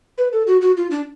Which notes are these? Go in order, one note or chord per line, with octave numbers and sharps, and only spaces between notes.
B4
A4
F#4
F#4
F4
D4